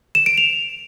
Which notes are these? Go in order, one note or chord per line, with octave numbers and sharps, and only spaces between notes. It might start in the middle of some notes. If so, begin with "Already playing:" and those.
E7
D7
F7